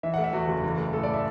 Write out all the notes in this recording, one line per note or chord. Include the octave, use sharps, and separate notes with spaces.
E3 E5
F#5
A3
E5
E2 F#4
F#1
E3
A3
A2 A4
D5
E5